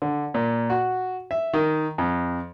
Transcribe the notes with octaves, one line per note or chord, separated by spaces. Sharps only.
D3
A#2
F#4
E5
D#3
F2